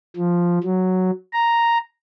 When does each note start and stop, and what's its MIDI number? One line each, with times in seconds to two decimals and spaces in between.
0.16 0.59 53
0.63 1.10 54
1.33 1.78 82